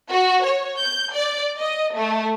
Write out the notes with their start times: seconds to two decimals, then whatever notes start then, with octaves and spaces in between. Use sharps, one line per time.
0.11 F#4
0.45 C#5
0.81 G6
1.14 D5
1.59 D#5
1.96 A3